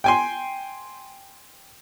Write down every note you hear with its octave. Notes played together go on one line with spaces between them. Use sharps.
G5 G#5 C6